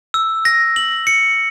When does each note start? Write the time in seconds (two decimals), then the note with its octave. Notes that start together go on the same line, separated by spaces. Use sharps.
0.14 E6
0.45 A#6
0.76 F#7
1.07 C#7